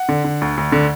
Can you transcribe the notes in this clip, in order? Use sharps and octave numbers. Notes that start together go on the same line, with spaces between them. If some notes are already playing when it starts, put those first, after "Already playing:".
Already playing: F#5
D3
D3
D2
D2
D3